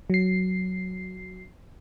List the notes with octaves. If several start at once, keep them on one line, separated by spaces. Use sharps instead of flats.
F#3 C7